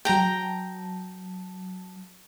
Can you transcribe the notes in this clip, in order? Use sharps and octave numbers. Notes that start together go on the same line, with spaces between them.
F#3 G5 A5 A#5